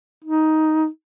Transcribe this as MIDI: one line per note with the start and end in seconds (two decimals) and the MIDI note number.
0.24 0.87 63